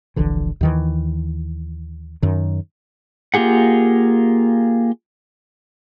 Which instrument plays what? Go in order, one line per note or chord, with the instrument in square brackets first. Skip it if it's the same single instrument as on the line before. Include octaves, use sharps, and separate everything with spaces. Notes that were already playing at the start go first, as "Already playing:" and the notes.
[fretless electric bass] D#1 A#1 D3 E3
D#2 D#3 E3
F#2 D#3
[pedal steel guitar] A#3 F4 G4 G#4 F#5